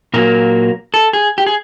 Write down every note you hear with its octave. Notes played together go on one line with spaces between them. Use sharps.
A#2 F#3 A#3 A#4
A4
G#4
G4
G#4